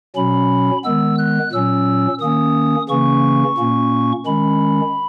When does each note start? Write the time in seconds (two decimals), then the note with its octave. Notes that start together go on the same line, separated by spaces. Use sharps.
0.16 B2 F#3 C#4 B5
0.84 D#3 G#3 B3 E6
1.18 F#6
1.53 A#2 F#3 C#4 E6
2.21 D#3 A#3 C#4 D#6
2.89 C#3 E3 A#3 C#4 C#6
3.58 A#2 A#3 C#4
4.26 D#3 G#3 C#4 B5